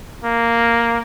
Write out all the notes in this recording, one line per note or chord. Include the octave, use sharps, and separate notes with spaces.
A#3